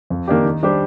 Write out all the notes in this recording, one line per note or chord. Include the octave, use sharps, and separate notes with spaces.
F2
D#3 A#3 D4 G4
D#3
G3 D4 G4 C5